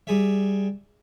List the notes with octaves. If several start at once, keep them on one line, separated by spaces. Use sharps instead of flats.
G3 G#4 E5